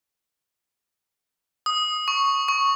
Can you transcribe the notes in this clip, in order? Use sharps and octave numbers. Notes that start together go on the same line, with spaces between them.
D#6
C#6
C#6